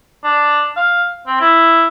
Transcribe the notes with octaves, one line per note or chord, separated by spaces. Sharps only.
D4
F5
C4
E4